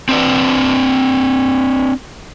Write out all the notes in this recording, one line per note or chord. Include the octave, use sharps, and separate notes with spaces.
C4 D4 B4 D5